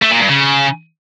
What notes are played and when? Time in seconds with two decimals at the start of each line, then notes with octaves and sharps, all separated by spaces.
0.02 A3
0.11 A#2
0.20 G2
0.29 C#3